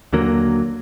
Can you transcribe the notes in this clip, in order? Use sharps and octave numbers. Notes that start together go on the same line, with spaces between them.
D#2 D3 F#3 A#3